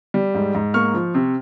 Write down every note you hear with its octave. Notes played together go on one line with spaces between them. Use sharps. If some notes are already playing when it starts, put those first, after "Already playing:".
G3
G#2
G#2
A#3 C#6 F6
F3
C3